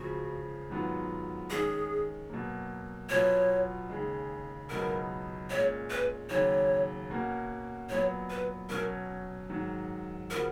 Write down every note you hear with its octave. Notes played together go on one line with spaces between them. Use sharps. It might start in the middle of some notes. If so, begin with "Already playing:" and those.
Already playing: C#2 C#3 F3 F#4
G#2 D#3 F#3 B3 F4
D#3 G#3 C#4 G#4
B2 F#3 A#3
B2 F#3 B3 F4 C#5
D#2 C#3 G#3
C#2 B2 F#3 B3 D#4 A#4
A#2 G#3 C#4 C#5
B4
D#2 C#3 F#3 C#5
B2 A#3 C#4 F#4 A#4
A#2 F#3 B3 F#4 C#5
B4
B2 F#3 C#4 A#4
G#2 D#3 F#3
C#3 F3 B3 F#4 A#4